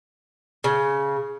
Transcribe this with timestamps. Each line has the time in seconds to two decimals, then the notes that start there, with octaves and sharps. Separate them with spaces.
0.64 C#3